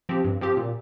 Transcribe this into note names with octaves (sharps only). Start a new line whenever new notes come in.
F3 C4 G4
G2
F3 C4 G4
A#2